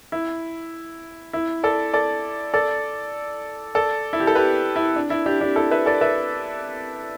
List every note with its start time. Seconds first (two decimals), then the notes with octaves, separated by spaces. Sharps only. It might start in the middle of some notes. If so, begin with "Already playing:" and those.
0.12 E4
1.33 E4
1.64 A4 D5
1.94 A4 D5
2.54 A4 D5
3.75 A4 D5
4.13 E4
4.20 G4
4.27 A4
4.35 G4 B4
4.76 E4
4.96 D4
5.10 E4
5.26 D4 G4
5.41 D4 G4
5.56 E4 A4
5.71 B4 E5
5.86 A4 D5
6.01 B4 E5